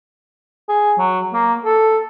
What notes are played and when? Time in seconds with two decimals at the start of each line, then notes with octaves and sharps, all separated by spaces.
0.69 G#4
0.98 F#3
1.33 A#3
1.65 A4